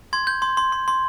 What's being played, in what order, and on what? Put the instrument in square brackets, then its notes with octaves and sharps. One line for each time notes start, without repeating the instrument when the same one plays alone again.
[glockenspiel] C6 G#6
G6
C6
C6
C6
C6